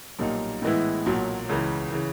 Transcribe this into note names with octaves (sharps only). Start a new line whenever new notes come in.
B1 A#2 G3 A#3 D#4
A2 E3 G#3 B3 E4
B1 A#2 F#3
C#2 C#3 E3
C#3 E3